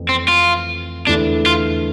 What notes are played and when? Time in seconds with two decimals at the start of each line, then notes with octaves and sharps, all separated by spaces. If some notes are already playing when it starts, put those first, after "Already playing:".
Already playing: F2 E3 A3
0.09 C4
0.28 F4
1.06 E2 D3 A3 D4 E4
1.46 F4